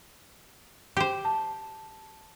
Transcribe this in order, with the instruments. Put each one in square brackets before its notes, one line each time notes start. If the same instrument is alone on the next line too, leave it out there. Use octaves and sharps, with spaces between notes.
[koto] G4 C5
[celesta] A5